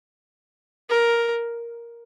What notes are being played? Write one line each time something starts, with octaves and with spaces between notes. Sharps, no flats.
A#4